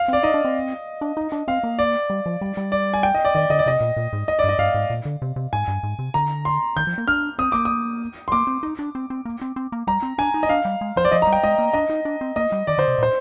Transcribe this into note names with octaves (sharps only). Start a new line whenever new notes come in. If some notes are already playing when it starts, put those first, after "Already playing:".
Already playing: F5
C4 D5
D#4 D#5
D4
C4
D4
D#4
D4
C4 F5
A#3
D5
G3
F3
G3
G3
D5
G#5
G5
D#5
D5
D#3 D5
D3 D#5
D5
C3 D#5
A#2
A#2
G#2
D#5
G2 D5
D#5
G2 F5
G#2
A#2
D3
C3
C3
G#2 G#5
G2
G#2
C3
D3 A#5
C6
D#3 G6
F3
A#3
D4 F6
C4 D#6
A#3 D6
D#6
C6
A#3 D6
C4
D#4
D4
C4
C4
A#3
C4
C4
A#3
G3 A#5
C4
D4 G#5
D#4
D#5
D4 F5
G3
G#3
F3 C5
D5
F3 D#5
A#5
G3
G5
G#3 D#5
A#3
D4 D#5
D#4
D4
C4
A#3 D#5
G3
D#3 D5
D3 C5
C3
A#2 C5